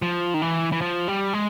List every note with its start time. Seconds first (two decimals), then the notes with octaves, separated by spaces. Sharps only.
0.02 F3
0.34 D#3
0.42 E3
0.72 E3
0.81 F3
1.08 G3
1.33 G#3